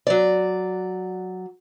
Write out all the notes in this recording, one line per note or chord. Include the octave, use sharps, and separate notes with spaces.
F#3 D5